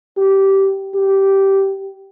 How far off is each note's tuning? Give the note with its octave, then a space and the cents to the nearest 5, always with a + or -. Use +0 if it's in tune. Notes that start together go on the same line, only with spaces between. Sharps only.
G4 -15
G4 -10